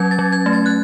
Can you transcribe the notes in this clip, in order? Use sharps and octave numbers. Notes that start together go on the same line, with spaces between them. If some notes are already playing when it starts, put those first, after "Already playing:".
Already playing: F#3 C#4 G#6
A6
F#3
G#6
A3
A6
F#6